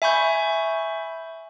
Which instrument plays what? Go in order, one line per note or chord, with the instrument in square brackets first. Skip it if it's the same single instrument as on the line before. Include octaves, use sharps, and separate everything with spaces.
[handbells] E5 G#5 B5 C#6 G6